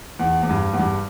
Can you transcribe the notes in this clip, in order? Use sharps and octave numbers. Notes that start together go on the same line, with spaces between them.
E2
E2
G2
E2
G2